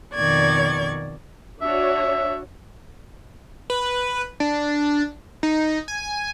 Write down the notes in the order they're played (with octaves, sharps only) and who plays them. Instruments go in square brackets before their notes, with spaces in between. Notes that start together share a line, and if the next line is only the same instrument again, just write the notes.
[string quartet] F2 B2 D#3 D5 C#6 G#6
[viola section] D4 F#4 C#5 [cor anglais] E5
[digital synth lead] B4
D4
D#4
G#5